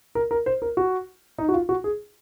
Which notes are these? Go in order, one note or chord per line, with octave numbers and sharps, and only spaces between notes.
A#4
A#4
C5
A#4
F#4
D#4
F#4
F4
F#4
G#4